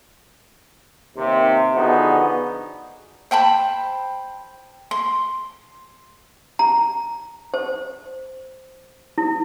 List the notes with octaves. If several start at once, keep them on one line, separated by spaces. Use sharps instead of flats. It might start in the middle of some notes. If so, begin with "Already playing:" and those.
D#2 C3
D3 F3 B3 D#4 F#4 G#4
C5 G5 A5 B5
C6
A#5
C5
E4